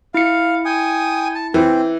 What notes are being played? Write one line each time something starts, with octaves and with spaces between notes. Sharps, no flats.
E4 F5 C#7
G5 G#5 D#6
A5
E3 C4